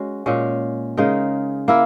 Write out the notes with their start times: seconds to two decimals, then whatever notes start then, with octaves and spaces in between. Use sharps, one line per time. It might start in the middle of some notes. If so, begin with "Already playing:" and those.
Already playing: G#3 C#4 F#4
0.26 A#2 G#3 C#4
0.97 C#3 G#3 D#4 A#4
1.68 A#3 E4 A#4